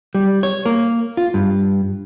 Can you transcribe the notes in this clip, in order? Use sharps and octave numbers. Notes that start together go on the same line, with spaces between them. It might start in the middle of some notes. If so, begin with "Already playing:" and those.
G3
C#5
A#3
F4
G2